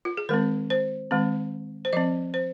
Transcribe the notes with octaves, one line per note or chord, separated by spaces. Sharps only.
F4
G#4
D#3 G#3 C4 A#4
C5
D#3 G#3 C4
C5
F3 C4 D#5
C5